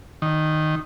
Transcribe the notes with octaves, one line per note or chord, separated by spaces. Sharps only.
D#3